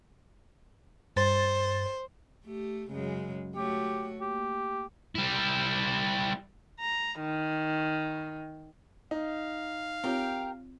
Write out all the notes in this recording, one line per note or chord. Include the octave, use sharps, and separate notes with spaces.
G2 C5 A6
A3 G4
F#2 C#3 G#3
A3 F#4 G4 C#5
A#3 G4
G3 E4
A#5
D#3
D#4 F5
C4 F4 G4 A#4 C#5 G5